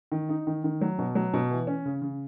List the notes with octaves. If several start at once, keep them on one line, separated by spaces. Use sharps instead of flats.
D#3
D#4
D#3
D#3
F#3
B2
F#3
B2
E3
C#4
C#3
C#3